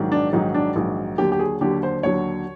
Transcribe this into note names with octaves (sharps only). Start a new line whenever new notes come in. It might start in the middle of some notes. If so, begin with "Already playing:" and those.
Already playing: A#1 G#2 D#3 F#3
D4
A#1 G#2 D#3 F#3 D#4
D4
A#1 G#2 D#3 F#3
D#2 D3 F#3 G4
G4
G#4
D#2 D3 F#3 G4
C5
D#2 D3 F#3 C#5